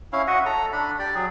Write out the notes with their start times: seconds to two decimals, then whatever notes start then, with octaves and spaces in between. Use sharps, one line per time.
0.13 C#4 E4 F5
0.27 F#4 D#5 E5 F#5
0.46 A4 A#5
0.73 D4 B5
0.99 G4 D5
1.15 F#3 G#4